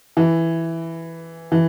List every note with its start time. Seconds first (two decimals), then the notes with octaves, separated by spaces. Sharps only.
0.17 E3
1.52 E3